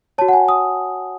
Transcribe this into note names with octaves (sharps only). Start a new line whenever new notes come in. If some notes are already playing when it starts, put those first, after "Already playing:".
F#4 C#5 A5
F#5
G#5
D#6